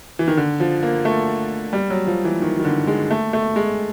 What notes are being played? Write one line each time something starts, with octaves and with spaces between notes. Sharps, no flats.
E3
D#3
D3
F3
A#3
A3
G3
F#3
F3
E3
D#3
D#3
D3
G#3
A3
A3
G#3